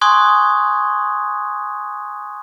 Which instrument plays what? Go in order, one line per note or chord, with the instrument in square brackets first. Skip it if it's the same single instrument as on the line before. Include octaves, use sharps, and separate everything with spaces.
[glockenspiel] G#5 C6 C#6 D#6 F#6 G#6